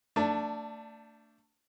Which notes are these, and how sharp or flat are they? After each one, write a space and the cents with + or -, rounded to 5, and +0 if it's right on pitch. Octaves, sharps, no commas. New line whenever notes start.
A3 +30 D4 -5